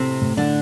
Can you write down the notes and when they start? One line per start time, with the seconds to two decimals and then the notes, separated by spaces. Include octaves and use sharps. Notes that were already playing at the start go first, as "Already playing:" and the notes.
Already playing: A2 C3 A3 C4
0.21 A2
0.37 D3 D4